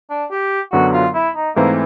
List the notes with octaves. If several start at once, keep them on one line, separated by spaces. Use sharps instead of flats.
D4
G4
F#2 D3 F#3 B3 F#4
F4
E4
D#4
G#2 E3 A3 A#3 C4 E4